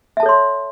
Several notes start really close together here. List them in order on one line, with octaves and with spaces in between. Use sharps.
E5 A5 A4 C#5 C6